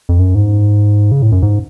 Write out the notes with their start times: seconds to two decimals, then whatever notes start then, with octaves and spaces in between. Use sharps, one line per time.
0.09 F2
0.19 F#2
0.35 G#2
1.12 C#3
1.22 A2
1.32 F#2
1.43 G#2